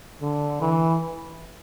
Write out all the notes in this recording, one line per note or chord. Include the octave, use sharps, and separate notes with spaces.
D3
E3